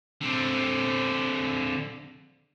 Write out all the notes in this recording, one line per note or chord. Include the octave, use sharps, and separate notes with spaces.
D3 C4